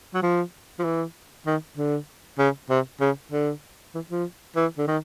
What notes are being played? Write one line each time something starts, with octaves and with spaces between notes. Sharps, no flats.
F#3
F3
F3
E3
D#3
D3
C#3
C3
C#3
D3
E3
F3
E3
D3
D#3